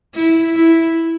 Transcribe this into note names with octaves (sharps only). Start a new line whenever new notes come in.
E4
E4